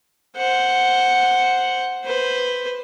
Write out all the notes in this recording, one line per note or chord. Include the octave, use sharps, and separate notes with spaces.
C5 F#5
B4 C5